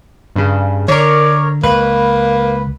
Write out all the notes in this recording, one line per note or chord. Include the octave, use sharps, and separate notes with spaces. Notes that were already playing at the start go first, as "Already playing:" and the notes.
G2 C#3
D3 A#4 C#5 D5
C#2 A#3 B4